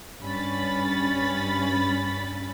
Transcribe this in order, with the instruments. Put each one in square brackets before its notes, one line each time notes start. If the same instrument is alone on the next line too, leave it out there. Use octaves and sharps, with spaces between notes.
[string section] G2 C#4 B5 A6